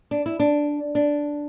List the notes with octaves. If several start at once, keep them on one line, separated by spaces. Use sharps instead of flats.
D4
E4
D4
D4